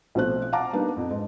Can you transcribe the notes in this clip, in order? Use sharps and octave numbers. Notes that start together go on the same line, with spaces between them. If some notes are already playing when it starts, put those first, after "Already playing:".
B1 F3 A3 C4 C5 F#6
F5 F#5 A5 A#5 D6
G3 A#3 B3 D4 D#4
F2
G#2